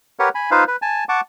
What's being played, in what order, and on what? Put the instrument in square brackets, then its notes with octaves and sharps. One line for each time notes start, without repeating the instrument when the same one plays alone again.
[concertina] G4 A#4 B4 C#5 F#5
G#5 B5
D#4 F4 B4 C5 F5
B4
G#5 A5
F#5 A5 C#6 D6